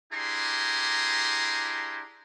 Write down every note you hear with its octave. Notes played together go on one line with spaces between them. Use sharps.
D4 E4 G4 G#4 A#5 C6